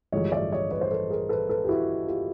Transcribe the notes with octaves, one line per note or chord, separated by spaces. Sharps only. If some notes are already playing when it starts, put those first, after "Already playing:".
A1 G2 D3 F3 G#3 C#5 D#5
D5 E5
C#5 D#5
B4 C#5
C5
A4 B4
G#4 A#4
A4 B4
A4 B4
G4
E4 F#4
F4 G4